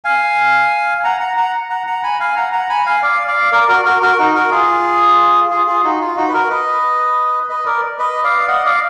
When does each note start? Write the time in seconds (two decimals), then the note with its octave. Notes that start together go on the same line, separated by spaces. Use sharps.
0.04 F5 G#5
1.04 F#5 A#5
1.21 F#5 A#5
1.37 F#5 A#5
1.70 F#5 A#5
1.87 F#5 A#5
2.03 G#5 B5
2.20 F5 G#5
2.36 F#5 A#5
2.52 F#5 A#5
2.69 G#5 B5
2.86 F5 G#5
3.02 D5 F5
3.28 D5 F5
3.52 A#4 D5
3.68 F#4 A#4
3.85 F#4 A#4
4.02 F#4 A#4
4.18 D#4 F#4
4.35 F#4 A#4
4.51 F4 G#4
5.50 F4 G#4
5.67 F4 G#4
5.84 D#4 F#4
6.01 F4
6.17 D#4 F#4
6.28 B4
6.34 F#4 A#4
6.50 B4 D#5
7.49 B4 D#5
7.66 A#4 D5
7.99 B4 D#5
8.24 D5 F5
8.48 D#5 F#5
8.65 D5 F5